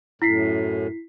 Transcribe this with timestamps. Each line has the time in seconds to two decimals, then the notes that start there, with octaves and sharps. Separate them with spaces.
0.22 F#2 A2 E4 B6 C7